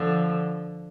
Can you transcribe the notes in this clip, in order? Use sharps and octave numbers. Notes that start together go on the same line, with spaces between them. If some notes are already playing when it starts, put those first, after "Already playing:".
Already playing: D3 F3